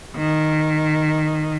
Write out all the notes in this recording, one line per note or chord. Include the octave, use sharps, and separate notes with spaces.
D#3